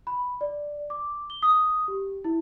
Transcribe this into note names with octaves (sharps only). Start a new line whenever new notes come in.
B5
D5
D6
G7
D#6
G4
E4